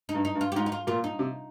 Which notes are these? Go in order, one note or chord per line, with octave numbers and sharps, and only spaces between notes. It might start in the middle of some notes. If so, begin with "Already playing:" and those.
D#4
G2
D#4
G2
F4
G4
G#2 F4
D#4
F4
A#2 F4
D#4
C3